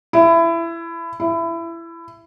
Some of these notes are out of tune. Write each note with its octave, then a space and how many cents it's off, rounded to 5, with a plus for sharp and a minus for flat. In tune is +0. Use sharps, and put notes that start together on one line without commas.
E4 +20
E4 +20